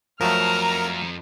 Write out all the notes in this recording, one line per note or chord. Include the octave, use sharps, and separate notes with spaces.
F2 F3 F#3 A3 A#4 A5 A#5 F6